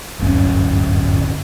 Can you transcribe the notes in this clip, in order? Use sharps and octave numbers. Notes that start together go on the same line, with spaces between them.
D1 G1 F#2 C#4